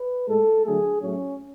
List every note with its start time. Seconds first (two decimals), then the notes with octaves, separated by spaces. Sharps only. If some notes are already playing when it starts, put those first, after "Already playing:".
Already playing: B4
0.28 A2 G#3 A4
0.64 D3 F#3 A3 G#4
1.01 A2 F#3 A3 C#4